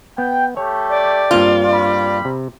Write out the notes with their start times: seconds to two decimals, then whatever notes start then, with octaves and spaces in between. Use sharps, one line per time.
0.18 B3 G5
0.57 A3 G4 C#5
0.90 D5
1.31 G2 A#3 C4 F4
1.73 G3 B5
2.25 C3